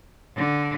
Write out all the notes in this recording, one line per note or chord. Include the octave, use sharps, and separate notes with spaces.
D3